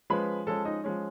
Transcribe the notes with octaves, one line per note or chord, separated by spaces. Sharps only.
F3 G#3 C#4 B4 B5
F3 G#3 C#4 A4 A5
D#4 D#5
F3 G#3 C#4